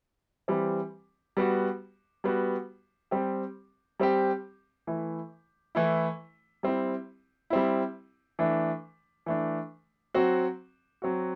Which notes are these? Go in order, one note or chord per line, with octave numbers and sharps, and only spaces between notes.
E3 G3 C4 G4
G3 B3 F#4
G3 B3 F#4
G3 C4 G4
G3 C4 G4
E3 A3 E4
E3 A3 E4
G3 C4 E4
G3 C4 E4
E3 A3 D4
E3 A3 D4
F#3 C4 F#4
F#3 C4 F#4